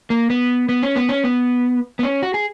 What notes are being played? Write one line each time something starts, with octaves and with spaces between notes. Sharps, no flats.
A#3
B3
B3
C#4
B3
C#4
B3
B3
C#4
F#4
G#4